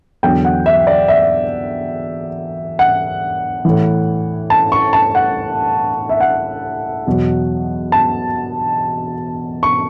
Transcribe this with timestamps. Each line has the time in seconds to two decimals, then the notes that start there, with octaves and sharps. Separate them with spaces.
0.23 E2 D3 F#3 G5
0.45 F#5
0.66 E5
0.87 D5
1.08 E5
2.79 F#5
3.65 A2 E3
4.50 A5
4.72 C#6
4.93 A5
5.15 F#5
6.09 E5
6.20 F#5
7.07 E2 B2 F#3
7.92 A5
9.63 C#6